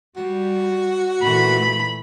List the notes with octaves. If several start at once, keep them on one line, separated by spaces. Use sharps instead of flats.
G3 F#4
A#2 E3 A3 B5